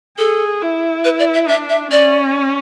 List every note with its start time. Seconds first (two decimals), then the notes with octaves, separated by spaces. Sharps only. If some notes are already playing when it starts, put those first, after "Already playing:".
0.18 G#4 A4
0.62 E4
1.05 B4
1.19 D5
1.34 E5
1.48 D4 E5
1.69 E5
1.91 C#4 D5